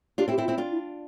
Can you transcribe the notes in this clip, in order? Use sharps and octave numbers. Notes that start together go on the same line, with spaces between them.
D4 F4 G4
C4 E4
G4
C4 E4
F4
C4 E4
D4 F4
E4